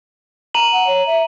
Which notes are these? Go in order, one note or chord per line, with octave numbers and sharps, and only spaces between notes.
A#5 D#7 F#7
F#5
C#5
E5